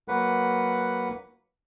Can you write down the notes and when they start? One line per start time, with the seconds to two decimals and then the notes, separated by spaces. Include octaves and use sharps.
0.08 F#3 A#3 B4 F#5